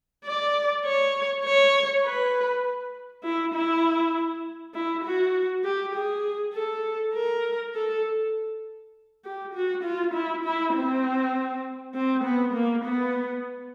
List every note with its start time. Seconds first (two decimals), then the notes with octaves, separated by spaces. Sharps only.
0.25 D5
0.84 C#5
1.44 C#5
2.04 B4
3.24 E4
3.54 E4
4.75 E4
5.04 F#4
5.64 G4
5.94 G#4
6.54 A4
7.14 A#4
7.74 A4
9.25 G4
9.54 F#4
9.84 F4
10.14 E4
10.45 E4
10.74 C4
11.94 C4
12.24 B3
12.54 A#3
12.84 B3